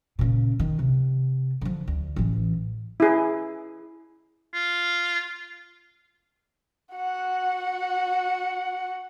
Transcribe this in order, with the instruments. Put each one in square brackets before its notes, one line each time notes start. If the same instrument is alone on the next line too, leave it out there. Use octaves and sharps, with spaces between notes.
[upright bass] A#2 C#3
D#3
C3
D3 F3
D2
A1 E3
[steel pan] E4 G#4
[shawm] F4
[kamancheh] F#4 F#5